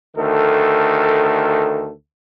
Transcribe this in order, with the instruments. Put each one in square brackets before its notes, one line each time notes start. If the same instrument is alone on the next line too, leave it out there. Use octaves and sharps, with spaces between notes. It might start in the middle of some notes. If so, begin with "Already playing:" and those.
[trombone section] D2 D#3 A4